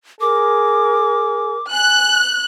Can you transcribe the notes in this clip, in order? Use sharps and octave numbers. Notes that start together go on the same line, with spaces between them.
G#4 A#4 D6
G#5 F#6